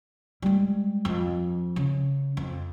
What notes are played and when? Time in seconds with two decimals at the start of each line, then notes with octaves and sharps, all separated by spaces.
0.42 G3 G#3
1.05 F2
1.76 C#3
2.37 F2